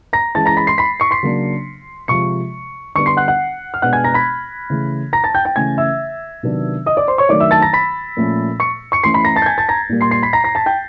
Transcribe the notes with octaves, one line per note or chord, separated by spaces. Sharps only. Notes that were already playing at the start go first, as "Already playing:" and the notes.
A#5 A#6
E3 G#3 C#4 A5 A6
A#5 A#6
B5 B6
C6 C7
B5 B6
C#6 C#7
C6 C7
C#3 F#3 A#3 D4
C3 F3 G#3 C#6 C#7
D3 G3 B3 D4 C#6 C#7
C6 C7
F#5 F#6
F#5 F#6
F6
B2 G#3 B3 D4 F#5 F#6
G#5 G#6
A#5 A#6
B5 B6
C#3 E3 A3
A#5 A#6
A5 A6
G5 G6
G5 G6
C#3 E3 A3 C#4 G#5 G#6
E5 E6
C3 D#3 F#3 B3 D4
D#5 D#6
D5 D6
C5 C6
C#5 C#6
D#3 F#3 A3 D4 D5 D6
E5 E6
A5 A6
A#5 A#6
B5 B6
A#2 F3 A3 C#4
C#6 C#7
C#6 C#7
E3 A3 C#4 C6 C7
B5 B6
A#5 A#6
A5 A6
G6
G#5 G#6
A5 A6
A#5 A#6
A#2 G3 A#3
C6 C7
C6 C7
B5 B6
A#5 A#6
A#5 A#6
A5 A6
G5 G6